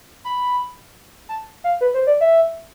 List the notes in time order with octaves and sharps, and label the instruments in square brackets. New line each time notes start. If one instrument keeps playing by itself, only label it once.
[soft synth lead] B5
A5
F5
B4
C5
D5
E5